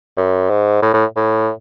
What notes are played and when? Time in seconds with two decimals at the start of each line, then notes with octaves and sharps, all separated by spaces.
0.17 F#2
0.50 G#2
0.82 A2
0.94 A2
1.16 A2